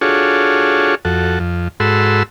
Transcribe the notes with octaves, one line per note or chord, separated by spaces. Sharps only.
D4 F4 F#4 G#4 A4 C#5
F2 F#4 A4
F2
G#2 F#4 A4 B5 C6 E6